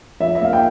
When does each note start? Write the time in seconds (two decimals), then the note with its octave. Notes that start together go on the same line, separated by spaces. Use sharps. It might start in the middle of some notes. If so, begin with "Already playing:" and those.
0.20 F3 E5
0.35 E5
0.42 A#3 F5
0.53 G5